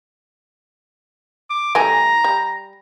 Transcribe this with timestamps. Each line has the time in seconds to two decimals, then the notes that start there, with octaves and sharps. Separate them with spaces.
1.50 D6
1.75 E3 G3 A3 G#5 A#5
2.24 G3